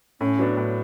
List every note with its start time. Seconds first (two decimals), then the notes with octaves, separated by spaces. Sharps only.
0.21 A2 C#4
0.39 F#3 B3 D4
0.57 A2